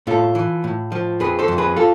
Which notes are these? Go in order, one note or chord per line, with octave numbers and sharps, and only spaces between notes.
A2 F4 A4
E3
A2
F3
F2 G#4 B4
A4 C5
F2
G#4 B4
F4 A4